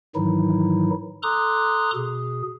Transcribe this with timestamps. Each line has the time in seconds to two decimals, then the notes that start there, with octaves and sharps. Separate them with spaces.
0.16 G#2 D#3 E3 F#3 D#4 E4
1.23 A4 A#5 C6 D6 D#6 F#6
1.95 B2 G#4